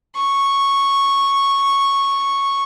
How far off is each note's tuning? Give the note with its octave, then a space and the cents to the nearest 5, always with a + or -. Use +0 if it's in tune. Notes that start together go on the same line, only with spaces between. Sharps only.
C#6 -5